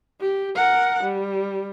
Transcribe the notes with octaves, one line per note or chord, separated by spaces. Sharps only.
G4
A#4 F#5
G3